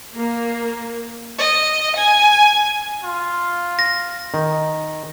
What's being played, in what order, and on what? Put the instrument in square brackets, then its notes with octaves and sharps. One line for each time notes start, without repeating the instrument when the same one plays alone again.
[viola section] A#3
[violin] D#5
G#5
[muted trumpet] F4
[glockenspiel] A#6
[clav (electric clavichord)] D#3